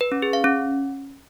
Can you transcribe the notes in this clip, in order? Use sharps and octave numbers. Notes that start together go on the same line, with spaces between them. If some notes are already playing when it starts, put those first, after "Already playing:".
B4
C#4
G#4
F5
C#4